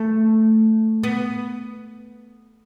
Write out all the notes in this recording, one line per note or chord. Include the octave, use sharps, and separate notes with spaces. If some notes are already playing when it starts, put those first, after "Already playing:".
Already playing: A3
B3